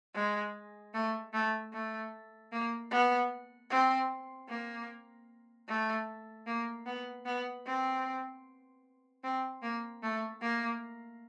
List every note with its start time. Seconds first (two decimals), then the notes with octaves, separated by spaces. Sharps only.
0.15 G#3
0.94 A3
1.33 A3
1.73 A3
2.52 A#3
2.91 B3
3.70 C4
4.49 A#3
5.68 A3
6.47 A#3
6.86 B3
7.26 B3
7.65 C4
9.24 C4
9.62 A#3
10.03 A3
10.42 A#3